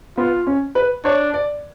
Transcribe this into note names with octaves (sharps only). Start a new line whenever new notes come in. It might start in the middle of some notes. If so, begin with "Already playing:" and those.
B3 F4
C#4
B4
D4 C#5
D5